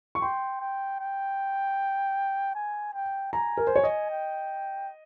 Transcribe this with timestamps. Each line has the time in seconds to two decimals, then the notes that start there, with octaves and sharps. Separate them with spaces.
0.15 C#6
0.22 G5 C6
0.61 G5
1.00 G5
2.55 G#5
2.94 G5
3.33 G#5 A#5
3.57 A#4
3.67 C5
3.76 C#5
3.84 D#5
4.10 G5